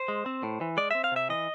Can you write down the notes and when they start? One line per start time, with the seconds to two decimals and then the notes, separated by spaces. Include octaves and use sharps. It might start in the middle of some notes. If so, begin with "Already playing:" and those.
Already playing: C5
0.08 G#3
0.26 C4
0.43 A2
0.61 E3
0.77 G#3 D5
0.91 C4 E5
1.04 F5
1.12 C3 E5
1.29 E3 D#5